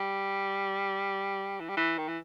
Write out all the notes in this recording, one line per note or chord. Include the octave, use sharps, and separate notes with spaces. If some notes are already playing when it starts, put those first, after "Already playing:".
Already playing: G3
E3
G3
E3
D#3
E3